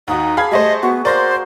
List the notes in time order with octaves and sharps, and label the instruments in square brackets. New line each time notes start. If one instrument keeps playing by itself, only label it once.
[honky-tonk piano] D#2 F#4 [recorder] D#4
[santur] G#4 A5 D6 [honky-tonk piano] F5 B5 G#6
[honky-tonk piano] G3 A3 C5 [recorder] D#5
[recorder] B3 [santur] F#4
[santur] A#3 [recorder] C5 [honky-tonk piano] D5 C6 A#6